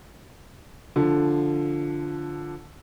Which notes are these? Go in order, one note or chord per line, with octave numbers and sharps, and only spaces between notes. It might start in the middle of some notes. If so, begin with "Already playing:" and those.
D3 F3